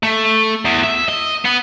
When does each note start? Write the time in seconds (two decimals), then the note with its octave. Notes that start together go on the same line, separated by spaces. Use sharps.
0.03 A3
0.65 E2
0.84 E5
1.08 D#5
1.45 B3